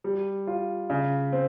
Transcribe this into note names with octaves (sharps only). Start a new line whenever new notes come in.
G3
F4
C#3
C4